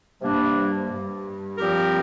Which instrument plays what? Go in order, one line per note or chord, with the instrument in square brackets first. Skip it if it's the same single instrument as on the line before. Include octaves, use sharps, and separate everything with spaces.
[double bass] G2 [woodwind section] C3 G3 A#3 D4
[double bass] G2
[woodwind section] A#2 F3 C4 G4 A#4